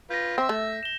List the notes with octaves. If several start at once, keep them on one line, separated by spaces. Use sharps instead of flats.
F4 B4 G6 A#6
C4 E5 E6
A3
E7 G7